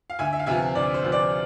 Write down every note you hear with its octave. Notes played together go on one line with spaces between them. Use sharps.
F5
D2 E5 G#5
E5
F5
C3 F3 B3 F4 E5 G#5
D2 D5
C5
C3 F3 B3 F4
D5